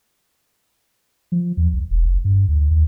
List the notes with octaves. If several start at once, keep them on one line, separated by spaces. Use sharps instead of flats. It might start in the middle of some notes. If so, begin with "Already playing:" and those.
F3
E2
C2
E1
F#1
G2
D2
D#2